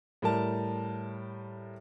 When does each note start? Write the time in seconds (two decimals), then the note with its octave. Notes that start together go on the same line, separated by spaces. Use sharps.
0.22 A2 G3 A#4 A5